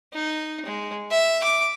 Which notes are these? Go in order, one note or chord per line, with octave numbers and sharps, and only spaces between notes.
D#4
G#3
E5
D6